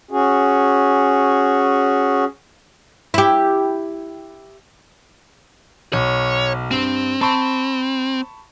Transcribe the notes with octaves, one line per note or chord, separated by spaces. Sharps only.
C#4 F#4 G#4
E4 G4
B1 C#5
G2 C4
C4 A5 B5 C#6